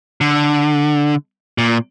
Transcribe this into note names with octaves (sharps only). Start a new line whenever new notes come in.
D3
A#2